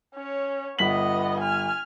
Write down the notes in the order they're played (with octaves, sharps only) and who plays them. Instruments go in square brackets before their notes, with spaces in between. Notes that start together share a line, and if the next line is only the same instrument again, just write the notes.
[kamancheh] C#4 C#5
[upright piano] G1 B6 F#7 [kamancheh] B3 D#5
[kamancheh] G#5 F6